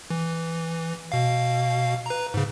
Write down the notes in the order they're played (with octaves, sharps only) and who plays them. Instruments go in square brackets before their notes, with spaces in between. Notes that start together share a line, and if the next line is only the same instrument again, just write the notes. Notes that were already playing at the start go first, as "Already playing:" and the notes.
[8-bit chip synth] E3
B2 F5
B4 A#5
G#2 C#3